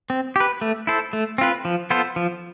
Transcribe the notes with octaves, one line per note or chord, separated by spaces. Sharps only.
C4
G4 B4
A3
E4 A4 C5
A3
C4 F4 B4
F3
B3 F4 A4 C5
F3